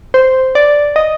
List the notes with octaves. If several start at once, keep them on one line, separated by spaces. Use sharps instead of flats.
C5
D5
D#5